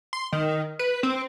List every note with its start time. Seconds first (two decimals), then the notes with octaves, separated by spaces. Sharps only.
0.13 C6
0.33 D#3
0.79 B4
1.03 C4